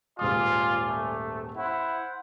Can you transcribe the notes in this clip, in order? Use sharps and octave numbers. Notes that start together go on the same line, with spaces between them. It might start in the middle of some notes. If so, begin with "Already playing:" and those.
D#1 G#2 F4 D5 G#5 D#6
A3
E4 C5 F#5